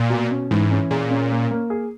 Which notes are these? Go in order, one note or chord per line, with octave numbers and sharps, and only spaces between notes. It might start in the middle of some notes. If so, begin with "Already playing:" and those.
Already playing: A#2
B2
C#4
G#2 E3
C#4
A#2 G#4
C#4
A#3
A#3
G#4